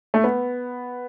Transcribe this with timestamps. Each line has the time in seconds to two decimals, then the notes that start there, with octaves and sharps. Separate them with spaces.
0.14 A3
0.24 B3